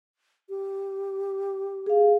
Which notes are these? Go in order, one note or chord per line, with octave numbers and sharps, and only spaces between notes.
G4
G#4 F5